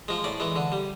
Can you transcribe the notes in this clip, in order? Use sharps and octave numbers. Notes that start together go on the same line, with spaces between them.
F3 G#3
A2 D5
E3 G#3
D3
G3